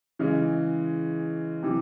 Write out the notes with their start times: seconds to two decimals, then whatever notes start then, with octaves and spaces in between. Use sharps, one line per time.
0.19 C#3 E3 G#3
1.63 C3 E3